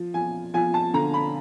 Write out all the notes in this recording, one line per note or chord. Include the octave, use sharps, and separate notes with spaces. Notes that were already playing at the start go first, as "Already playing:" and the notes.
Already playing: F3
F3 G#5
F3 G#5
A5
D3 A#5
B5